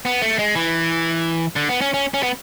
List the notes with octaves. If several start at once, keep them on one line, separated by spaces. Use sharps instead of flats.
B3
A3
G#3
E3
D3
B3
C#4
C#4
C#4
B3